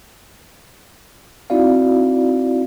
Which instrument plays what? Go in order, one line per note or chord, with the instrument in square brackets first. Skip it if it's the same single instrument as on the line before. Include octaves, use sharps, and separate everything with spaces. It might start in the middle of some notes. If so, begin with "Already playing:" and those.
[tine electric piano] C4 D#4 E4 F#4 D5 F5